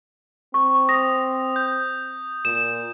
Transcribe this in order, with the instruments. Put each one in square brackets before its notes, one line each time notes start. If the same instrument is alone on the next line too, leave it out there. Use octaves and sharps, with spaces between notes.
[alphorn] C4 [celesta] C#6
[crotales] D#6 [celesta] A#6
[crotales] G6
[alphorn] A#2 [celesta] E7